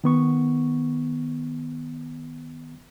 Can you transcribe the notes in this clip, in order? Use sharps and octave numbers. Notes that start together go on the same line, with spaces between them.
D#3 B3 C#6